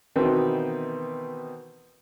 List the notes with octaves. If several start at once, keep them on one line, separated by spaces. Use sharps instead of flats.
B2 D#3 E3 B3 C4